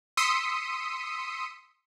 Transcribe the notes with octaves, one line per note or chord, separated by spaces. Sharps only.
C6 D#6 E6 B6 C#7 D#7